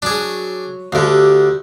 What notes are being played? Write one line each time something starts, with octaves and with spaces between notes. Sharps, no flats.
F#3 D4 G#4
D2 D3 G4 F5